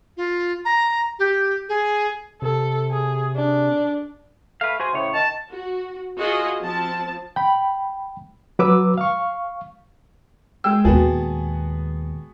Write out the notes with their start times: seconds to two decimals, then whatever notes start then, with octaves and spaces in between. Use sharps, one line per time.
0.17 F4
0.65 A#5
1.19 G4
1.69 G#4
2.42 C3 A4
2.91 G#4
3.36 D4
4.61 A3 B4 F5
4.80 F#4 G#4 C5 G#5
4.93 A2 C#3 C#5
5.14 D#3 A5
5.52 F#4
6.18 F4 F#4 G#4 D#5
6.61 F3 C4 A5
7.36 G5 B5
8.59 F#3 B4 D6 E6
8.98 F5 C#6
10.64 G#3 G#4 G5 E6
10.85 D#2 A#2 B3 F#4 G#4 A5